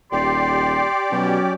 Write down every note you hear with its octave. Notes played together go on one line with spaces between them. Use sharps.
D#1 G4 D5 C6
B2 F#3 C#4